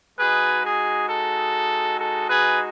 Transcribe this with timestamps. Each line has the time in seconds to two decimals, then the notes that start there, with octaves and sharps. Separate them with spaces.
0.19 G#3 D#4 F#4 G#4 B4
0.64 G#4
1.09 A4
2.00 A4
2.30 G#4 B4